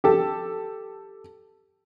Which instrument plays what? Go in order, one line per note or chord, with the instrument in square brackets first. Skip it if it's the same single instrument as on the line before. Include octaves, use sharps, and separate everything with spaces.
[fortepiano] G4 A4